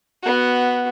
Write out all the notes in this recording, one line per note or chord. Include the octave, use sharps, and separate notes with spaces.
B3 F#4